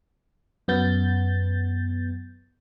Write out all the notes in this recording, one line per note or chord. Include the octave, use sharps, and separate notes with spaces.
F#2 B3 G6 A6